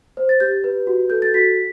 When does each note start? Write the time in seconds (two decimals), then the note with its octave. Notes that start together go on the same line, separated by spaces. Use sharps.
0.17 C5
0.29 A6
0.40 G4 G6
0.64 B4
0.87 F#4
1.10 A4 G6
1.22 A6
1.34 F#4 B6